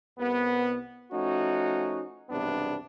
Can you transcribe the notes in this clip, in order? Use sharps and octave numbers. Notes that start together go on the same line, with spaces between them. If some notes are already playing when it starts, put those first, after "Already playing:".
C2 B3
F3 A3 C#4 D#4 F#4
B1 E2 G2 C3 B3 D4